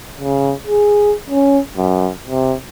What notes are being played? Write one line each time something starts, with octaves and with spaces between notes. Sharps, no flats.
C#3
G#4
C#4
F#2
C3